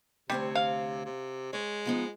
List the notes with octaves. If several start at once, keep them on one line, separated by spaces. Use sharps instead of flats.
D2 C3 G3 C4 C#5
F5
C3
G#3 C#5
F3 B3 D#4